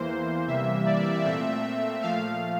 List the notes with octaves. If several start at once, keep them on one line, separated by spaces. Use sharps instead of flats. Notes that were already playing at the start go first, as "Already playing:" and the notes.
Already playing: E2 E3 A#3 C5
C3 E3 G3 A#3 E5
D5
A#2 A3 C4 E5
A#2 F3 A3 F5